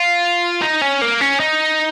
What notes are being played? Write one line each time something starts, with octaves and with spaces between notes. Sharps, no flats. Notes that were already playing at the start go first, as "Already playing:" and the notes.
Already playing: F4
D#4
C#4
A#3
C#4
D#4